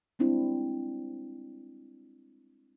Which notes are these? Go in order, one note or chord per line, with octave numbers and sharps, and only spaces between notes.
G3 G#3 C4 D4 E4